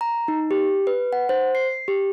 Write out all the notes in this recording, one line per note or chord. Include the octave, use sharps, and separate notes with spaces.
A#5
D#4
G4
B4
F#5
C5
C7
G4